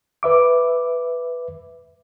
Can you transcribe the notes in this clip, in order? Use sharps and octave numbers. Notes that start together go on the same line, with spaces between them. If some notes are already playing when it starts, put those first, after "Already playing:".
B4 E5 D6